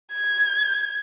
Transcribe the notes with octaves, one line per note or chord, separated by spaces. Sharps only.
G#6